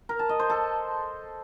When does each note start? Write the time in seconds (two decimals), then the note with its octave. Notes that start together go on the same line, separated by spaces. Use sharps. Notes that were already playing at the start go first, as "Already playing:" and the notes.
0.09 A#4
0.19 A5
0.29 D#5
0.39 C5
0.50 A4